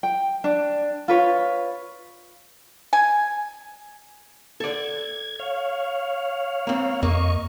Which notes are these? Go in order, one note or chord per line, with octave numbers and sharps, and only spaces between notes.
G5
D4
F4 B4 C#5
G#5
A4 D5 G#6
C#5 F5
A#3 C4
F2 A#3 D#5 C#6